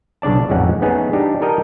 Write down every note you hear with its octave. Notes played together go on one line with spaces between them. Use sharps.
B1 C#3 D4 D5 A5
A1 F2 G#3 C#4 D#4 F#5
A3 B3 C#4 D#4 G#4
D4 D#4 G4
G4 A4 A#4 D#5 G5